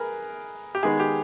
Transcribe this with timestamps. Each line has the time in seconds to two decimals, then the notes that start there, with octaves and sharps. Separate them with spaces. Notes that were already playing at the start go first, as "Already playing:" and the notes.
Already playing: G#4 A#4 B4
0.75 G4
0.83 D#3 G#3 B3 G#4
1.00 G4